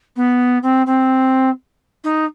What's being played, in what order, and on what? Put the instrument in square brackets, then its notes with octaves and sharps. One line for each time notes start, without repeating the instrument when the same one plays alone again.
[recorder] B3
C4
C4
D#4